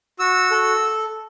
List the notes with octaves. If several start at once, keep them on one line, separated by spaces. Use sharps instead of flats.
F#4 E6
A4